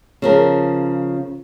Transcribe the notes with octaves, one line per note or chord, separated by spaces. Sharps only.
C#3 F3 A#4